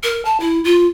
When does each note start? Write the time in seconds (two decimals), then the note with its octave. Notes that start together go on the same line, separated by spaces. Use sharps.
0.03 A#4
0.25 A5
0.40 E4
0.64 F4